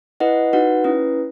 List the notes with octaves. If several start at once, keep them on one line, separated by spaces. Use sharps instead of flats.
E4 B4 D#5 F#5
D#4 F#4 B4 F#5
C#4 E4 B4